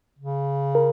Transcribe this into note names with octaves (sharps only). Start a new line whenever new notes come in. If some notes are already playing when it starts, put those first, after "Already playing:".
C#3
A#4